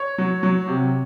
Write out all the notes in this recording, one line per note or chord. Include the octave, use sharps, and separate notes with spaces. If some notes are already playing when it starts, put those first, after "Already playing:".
Already playing: C#5
F#3
F#3
C3